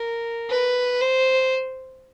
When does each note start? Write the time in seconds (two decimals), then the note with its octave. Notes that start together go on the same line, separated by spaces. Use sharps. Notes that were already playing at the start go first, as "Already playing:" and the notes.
Already playing: A#4
0.51 B4
1.01 C5